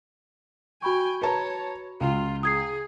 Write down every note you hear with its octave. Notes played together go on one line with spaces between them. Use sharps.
F#4 G5 G#5 B5 C#6
B4 C#5 A5 A#5
C#2 F4
G#4 D#6 G#6 C7